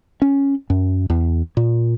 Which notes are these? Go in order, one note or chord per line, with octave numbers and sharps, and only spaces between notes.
C#4
F#2
E2
A#2